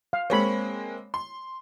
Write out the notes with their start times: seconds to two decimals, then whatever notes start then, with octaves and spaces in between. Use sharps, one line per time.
0.13 F5
0.30 G#3 A#3 C4 C#5 B5
1.14 C6